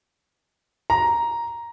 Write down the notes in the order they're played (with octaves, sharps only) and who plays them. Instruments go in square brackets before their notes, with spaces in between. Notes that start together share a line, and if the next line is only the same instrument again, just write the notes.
[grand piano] A#5